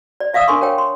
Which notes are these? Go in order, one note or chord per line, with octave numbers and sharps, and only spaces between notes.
D5
D5 E5 F5 D#6 E6
D4 A#4 G#5 C6 C#6
A#4 C#5 G5
C6